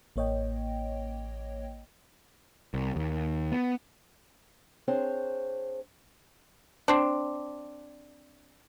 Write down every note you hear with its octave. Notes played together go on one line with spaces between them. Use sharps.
A1 A#3 C#5 D#5 G5
C2
D#2
B3
C4 D4 G#4 C5 C#5
C4 D4